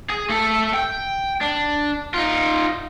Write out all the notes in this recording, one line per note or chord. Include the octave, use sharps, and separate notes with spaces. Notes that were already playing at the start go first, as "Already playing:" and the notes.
G#4
A3 A4
G5
D4
D#4 F4